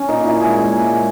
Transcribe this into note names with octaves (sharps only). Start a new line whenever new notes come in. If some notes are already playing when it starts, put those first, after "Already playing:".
Already playing: C#4
A#2 D#4
A#2 E4
G#3 G#4
A#2
A#2
G#3